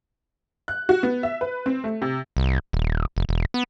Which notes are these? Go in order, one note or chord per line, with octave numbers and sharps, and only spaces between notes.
F#6
F#4
B3
E5
B4
C4
A3
C3
C2
D#1
F1
E1
B3